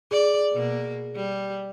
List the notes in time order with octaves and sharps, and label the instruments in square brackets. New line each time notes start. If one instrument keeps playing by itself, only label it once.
[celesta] G#4 [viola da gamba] D5
[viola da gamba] B2 A#3
G3